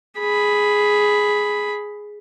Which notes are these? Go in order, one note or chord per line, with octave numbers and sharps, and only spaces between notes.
G#4 B5